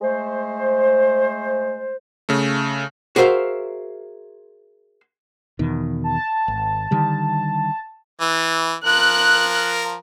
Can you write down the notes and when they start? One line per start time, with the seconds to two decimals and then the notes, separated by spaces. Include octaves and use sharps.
0.02 G#3 A3 C5
2.29 C#3 A3
3.16 F#4 G#4 A#4 C5 E5 F5
5.59 E2 B2 D#3
6.04 A5
6.48 G#1
6.91 D3 D#3 G3
8.21 E3
8.85 F3 A#4 F#6